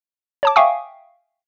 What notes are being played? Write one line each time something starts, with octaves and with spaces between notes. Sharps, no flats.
C#5 A5 D6
E5 F5 G5 G#5 C#6 D#6